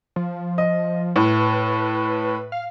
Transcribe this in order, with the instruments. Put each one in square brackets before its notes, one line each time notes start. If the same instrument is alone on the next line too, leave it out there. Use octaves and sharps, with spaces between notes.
[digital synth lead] F3
[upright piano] D#5
[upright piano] A2 [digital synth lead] B4
[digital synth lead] F5